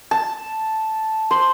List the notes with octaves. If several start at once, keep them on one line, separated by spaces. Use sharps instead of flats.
A5
C5